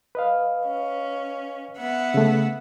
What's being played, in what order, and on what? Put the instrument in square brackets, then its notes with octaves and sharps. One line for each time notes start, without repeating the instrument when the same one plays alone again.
[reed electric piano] B4 D#5 F5
[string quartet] C#4
B3 E5 F#5
[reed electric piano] C#3 A3